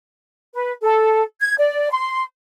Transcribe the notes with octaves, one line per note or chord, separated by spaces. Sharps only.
B4
A4
G#6
D5
C6